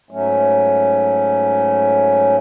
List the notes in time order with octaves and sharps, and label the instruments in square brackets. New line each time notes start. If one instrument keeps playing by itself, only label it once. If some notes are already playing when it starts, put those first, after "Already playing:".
[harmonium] G#2 F#3 A3 C#4